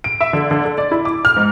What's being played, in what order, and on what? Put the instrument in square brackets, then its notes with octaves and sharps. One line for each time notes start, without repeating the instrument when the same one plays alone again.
[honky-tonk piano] D7
E5
D3
D3
A4
D5
E4
D6
F6
G#2